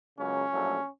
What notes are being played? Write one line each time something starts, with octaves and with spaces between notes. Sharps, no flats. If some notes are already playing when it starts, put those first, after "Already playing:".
C#2 C#3 F#3 A#3 C#4
A#1 A2 F#3 A3